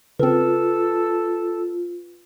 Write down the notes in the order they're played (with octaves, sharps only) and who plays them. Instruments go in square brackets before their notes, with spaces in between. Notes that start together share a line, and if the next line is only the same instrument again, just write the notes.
[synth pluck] C#3 C4 [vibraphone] F4 [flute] A4 [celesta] B4